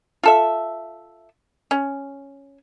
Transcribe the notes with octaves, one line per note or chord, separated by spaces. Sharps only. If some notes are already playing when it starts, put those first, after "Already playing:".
F4 A4 E5
C#4